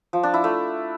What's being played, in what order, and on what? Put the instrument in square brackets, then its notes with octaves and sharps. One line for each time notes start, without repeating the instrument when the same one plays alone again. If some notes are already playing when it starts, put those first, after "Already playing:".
[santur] F3
D4
E4
A3